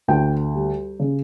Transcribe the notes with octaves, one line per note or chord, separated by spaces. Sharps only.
D2 G5
G3
C#3